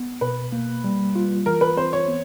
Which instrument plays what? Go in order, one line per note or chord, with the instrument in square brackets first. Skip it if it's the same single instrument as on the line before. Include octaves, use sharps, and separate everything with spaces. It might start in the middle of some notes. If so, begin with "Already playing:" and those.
Already playing: [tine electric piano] B3
[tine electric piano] B2 [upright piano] B4
[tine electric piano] A#3
G3
F4
[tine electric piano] E3 [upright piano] A#4
[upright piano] B4
[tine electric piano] C4 [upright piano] C5
[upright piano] C#5
[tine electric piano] B3